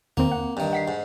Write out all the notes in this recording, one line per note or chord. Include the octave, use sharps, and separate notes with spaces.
E2 D#3 A#3 C4
F#5
G2 D#3
F#5 B6 C7
G#2